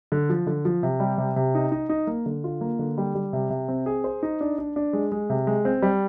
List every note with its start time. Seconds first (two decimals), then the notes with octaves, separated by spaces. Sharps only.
0.12 D3
0.29 F3
0.47 D3
0.65 F3
0.83 C3
1.00 G3
1.18 C3
1.36 C3
1.55 D#4
1.72 D#4
1.89 D#4
2.07 A#3
2.26 D3
2.44 F4
2.61 A#3
2.79 D3
2.98 G3
3.15 G3
3.33 C3
3.50 C3
3.68 C4
3.86 G#4
4.04 C5
4.23 D#4
4.41 D4
4.58 D4
4.76 D4
4.93 G#3
5.12 G#3
5.30 C3
5.47 G#3
5.65 C4
5.82 G3